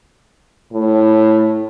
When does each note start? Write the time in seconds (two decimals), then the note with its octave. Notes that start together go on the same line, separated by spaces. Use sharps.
0.73 A2